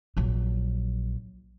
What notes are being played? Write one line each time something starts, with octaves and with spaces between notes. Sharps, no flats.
A#1 F#3